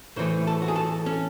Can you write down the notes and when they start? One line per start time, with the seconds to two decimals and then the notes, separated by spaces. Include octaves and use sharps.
0.16 A2 E3 A3 C5
0.47 A4
0.62 F#4
0.68 G#4
0.76 A4
1.06 C#4